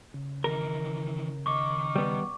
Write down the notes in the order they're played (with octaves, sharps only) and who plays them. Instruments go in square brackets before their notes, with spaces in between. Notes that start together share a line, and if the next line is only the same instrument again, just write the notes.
[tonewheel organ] C#3
[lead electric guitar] D#3 E3 [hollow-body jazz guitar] A#4
[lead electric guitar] D#3 D#5 [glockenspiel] C#6 D6
[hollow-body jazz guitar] G3 B3